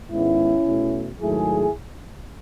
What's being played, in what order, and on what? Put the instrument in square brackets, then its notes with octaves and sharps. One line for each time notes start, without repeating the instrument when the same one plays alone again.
[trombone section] G#2 D#3 G#3 B3 C#4 E4
B2 A3
G#2 D#3 F#3 A3 E4 G#4